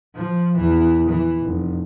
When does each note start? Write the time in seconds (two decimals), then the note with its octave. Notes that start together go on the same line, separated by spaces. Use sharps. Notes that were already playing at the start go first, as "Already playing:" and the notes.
0.15 F3
0.57 E2 E3
1.08 E3
1.42 F1